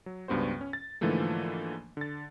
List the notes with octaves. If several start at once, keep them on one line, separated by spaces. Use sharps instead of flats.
F#3
C#2 G2 B3 F#4 C5
C#4
A6
G#2 D3 E3 F3 A3 A#3
D3 A6